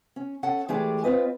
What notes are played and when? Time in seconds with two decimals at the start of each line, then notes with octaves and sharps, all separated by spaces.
0.16 C#4
0.43 C#4 A4 F#5
0.68 E3 G#3 A3 G4 G#4 D5
1.04 C4 F4 B4 D#5